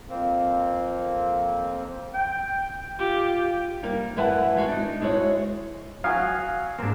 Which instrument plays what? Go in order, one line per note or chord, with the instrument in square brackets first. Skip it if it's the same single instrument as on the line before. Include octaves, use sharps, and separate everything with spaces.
[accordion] F2 A#3 C4
[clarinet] G5
[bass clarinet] F4 [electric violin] G4
[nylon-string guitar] G3 A#3 A#4 F5
F#2 E3 B4 E5 F#5 A5
G#3 F#4
D4 D#4
G#3 E4 F#4 C#5
[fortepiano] F#3 F5 F6 [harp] F#5 G#5 D#6
[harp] G#2 C4 [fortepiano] A#3 D4